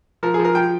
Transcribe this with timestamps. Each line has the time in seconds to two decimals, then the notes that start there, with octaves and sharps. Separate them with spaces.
0.23 F3 A#4
0.34 G#4
0.39 F3
0.45 A#4
0.55 F3 G5